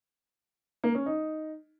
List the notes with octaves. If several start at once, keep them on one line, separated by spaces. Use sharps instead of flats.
A#3
C#4
D#4